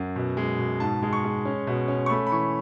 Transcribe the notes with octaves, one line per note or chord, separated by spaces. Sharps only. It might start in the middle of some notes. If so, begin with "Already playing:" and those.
Already playing: F#2 F#5
B2
G#3
B2
G#2 A5
G#3
C#6
G#3
C#4
B2
C#4
C#6
A3 B5
B5
E3 C#6